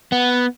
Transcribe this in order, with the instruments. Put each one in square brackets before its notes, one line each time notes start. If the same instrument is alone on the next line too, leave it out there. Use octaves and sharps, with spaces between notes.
[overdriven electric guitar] B3